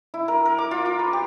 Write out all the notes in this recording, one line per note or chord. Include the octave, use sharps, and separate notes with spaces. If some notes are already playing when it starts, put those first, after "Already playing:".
E4
A#4
A#4
D6
F4
D6
B4
G4